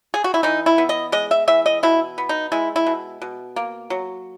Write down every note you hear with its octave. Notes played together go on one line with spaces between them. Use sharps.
G#4
F#4
E4
E3 D#4
E4
B3
D#5
G#3 D#5
E5
E3 E5
D#5
B2 E4
B3
D#4
G#3 E4
E4
B2
B2
A#3
F#3